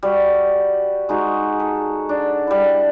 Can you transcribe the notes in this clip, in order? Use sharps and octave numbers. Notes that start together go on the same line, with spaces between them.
G3 F#4
G#3 D#4 F#4
A4
D4
G3 E4